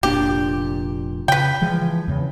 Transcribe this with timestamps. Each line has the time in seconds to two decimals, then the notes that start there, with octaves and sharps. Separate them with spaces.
0.03 F1 A#2 D4 G4
1.28 C#3 B4 G5
1.61 E3 F3 G#3
2.08 E2 C#3